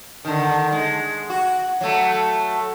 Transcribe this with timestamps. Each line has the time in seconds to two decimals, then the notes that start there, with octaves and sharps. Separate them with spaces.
0.25 D3 D#3
0.72 G#3
1.30 F#4
1.81 F#3 A3